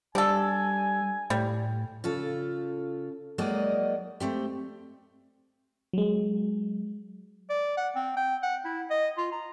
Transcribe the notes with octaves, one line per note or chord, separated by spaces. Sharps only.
G3 D4 A4 G#5
A2 G3
C#3 F4 A4
F#3 G#3 A#3 D#4 D5 D#5
A3 C4 G4
F#3 G#3
D5
F#5
C4
G5
F#5
E4
D#5
F4
A#5